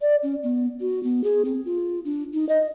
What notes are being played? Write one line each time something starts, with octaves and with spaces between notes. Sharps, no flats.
D5
C#4
B3
F#4
B3
G#4
C4
F4
D4
D#4
D#5